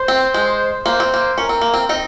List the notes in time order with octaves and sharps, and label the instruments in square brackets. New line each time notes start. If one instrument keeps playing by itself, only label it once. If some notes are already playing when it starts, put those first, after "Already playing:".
Already playing: [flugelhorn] C5
[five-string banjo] C4
G#3
[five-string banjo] A#3 [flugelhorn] C5
[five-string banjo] C4
A#3
[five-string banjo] C#4 [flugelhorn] A#4
[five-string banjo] C4
A#3
C4
C4 D#4